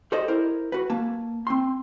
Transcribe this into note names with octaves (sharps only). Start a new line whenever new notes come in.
G4 A4 C5 D5 D#5
E4 A#4 C5
F#4 B4
A#3 A5
C4 C6